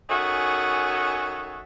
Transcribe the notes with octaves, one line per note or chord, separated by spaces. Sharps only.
D#3 C#4 F#4 G#4 A4 E5